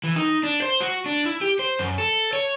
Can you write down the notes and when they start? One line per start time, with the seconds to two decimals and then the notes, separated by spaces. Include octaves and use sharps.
0.04 E3
0.16 D#4
0.43 D4
0.62 C5
0.81 F#4
1.06 D4
1.25 E4
1.41 G4
1.59 C5
1.79 F#2
1.98 A4
2.33 C#5